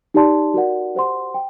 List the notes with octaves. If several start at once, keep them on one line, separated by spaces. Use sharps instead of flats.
D#4 G4 D5 A5 C6
F#4 A#4 D5 F#5
G4 C5 F#5 C6
G5